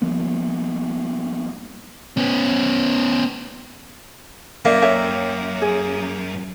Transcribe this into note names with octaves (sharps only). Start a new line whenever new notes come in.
F3 G3 A#3 B3
B3 C#4
F#2 A#3 D5 E5 F5
C#5 E5 G5
G#4